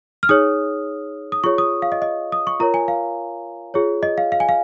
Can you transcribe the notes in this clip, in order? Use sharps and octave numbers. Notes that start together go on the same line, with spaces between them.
F6
D#4 G#4 C#5 D#6
D#6
F4 G#4 C#5 C#6
D#6
F5
D#5
D#5
D#6
C#6
F4 A#4 C#5 A#5
G#5
F5
F4 G#4 C#5
D#5
F5
F5
G#5
F5